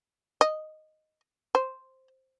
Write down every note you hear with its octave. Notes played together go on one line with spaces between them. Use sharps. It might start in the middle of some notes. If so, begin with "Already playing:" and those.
D#5
C5